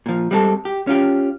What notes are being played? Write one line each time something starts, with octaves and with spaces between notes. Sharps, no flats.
A#2 F3
G3 G#3 C4 G4 A4
G4
C#4 F4 G4